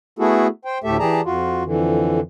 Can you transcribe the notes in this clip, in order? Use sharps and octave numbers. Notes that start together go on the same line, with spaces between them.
A3 B3 E4 F#4 G#4 A4
C5 G5
D2 A2 A3 G4 A4 E5
E3 G4 G#4 D5 A5 A#5
F2 F4 F#4
F2 D3 E3